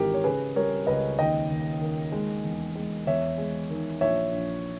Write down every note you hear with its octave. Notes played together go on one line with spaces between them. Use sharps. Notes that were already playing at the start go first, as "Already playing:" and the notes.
Already playing: G#1 G#2 E3 G4 A#4
C#5
C#3 G#4 B4
G3 A#4 C#5
C#2 B4 D#5
D#2 D#5 G5
D#2
D#3
G#3
E2
G#3
E2 C#5 E5
G#3
D#3
A#1 C#5 E5
A#1